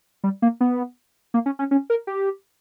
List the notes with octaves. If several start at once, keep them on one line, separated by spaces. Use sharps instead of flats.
G3
A#3
B3
A#3
C#4
C#4
C#4
A#4
G4